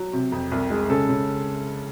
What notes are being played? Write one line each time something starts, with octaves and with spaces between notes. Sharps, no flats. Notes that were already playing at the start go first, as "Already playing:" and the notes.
Already playing: F#3
C3
F2
C2
G#3
C#3 A4
C#3